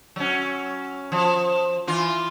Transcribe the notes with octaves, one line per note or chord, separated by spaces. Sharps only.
F#3 C#4
F3
E3 F4